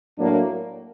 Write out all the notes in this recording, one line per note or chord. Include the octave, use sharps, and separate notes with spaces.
A2 F#3 A#3 D4